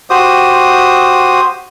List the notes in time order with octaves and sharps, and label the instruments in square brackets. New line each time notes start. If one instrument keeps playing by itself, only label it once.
[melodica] F#4 G4 C5 D#6